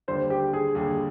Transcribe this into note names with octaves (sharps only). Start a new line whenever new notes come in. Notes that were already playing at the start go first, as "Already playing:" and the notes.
D#2 D3 G3 C5
G4
G#4
D#2 D3 G3 G#4